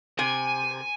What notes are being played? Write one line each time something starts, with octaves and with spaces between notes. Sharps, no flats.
C3 G#5